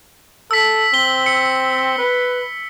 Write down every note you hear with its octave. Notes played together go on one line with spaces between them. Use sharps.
A4 E6 B6
C4 G7
C#7
B4